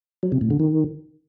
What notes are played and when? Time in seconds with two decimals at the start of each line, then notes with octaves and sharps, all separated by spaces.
0.23 F#3
0.32 C3
0.41 A2
0.50 D3
0.60 D#3